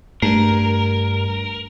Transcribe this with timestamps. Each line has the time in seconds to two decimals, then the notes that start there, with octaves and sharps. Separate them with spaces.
0.22 G2 A3 A#4